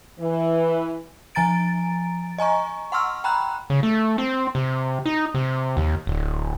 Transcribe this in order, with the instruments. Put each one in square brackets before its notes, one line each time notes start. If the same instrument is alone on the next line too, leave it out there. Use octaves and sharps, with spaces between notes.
[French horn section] E3
[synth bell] F3 G#5 A#5 A6 D7
D#5 G#5 A#5 C#6
F#5 C6 C#6 E6 F6
G5 A#5 B5 F#6
[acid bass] C#3
A3
C4
C3
D#4
C3
D#2
D1